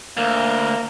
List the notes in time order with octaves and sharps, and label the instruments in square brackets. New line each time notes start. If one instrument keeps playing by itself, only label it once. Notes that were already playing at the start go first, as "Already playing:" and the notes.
[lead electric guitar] D2 [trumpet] A#3